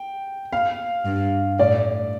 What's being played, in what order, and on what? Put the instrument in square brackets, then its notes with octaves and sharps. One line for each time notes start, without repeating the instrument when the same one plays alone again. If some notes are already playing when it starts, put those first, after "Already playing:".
Already playing: [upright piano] G5
F5
[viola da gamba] G2
[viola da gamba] A2 [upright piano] D5